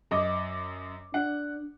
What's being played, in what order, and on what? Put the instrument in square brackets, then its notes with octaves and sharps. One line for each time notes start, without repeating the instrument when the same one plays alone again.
[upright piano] F#2 D#5 D6
[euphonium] D4 [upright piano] F#5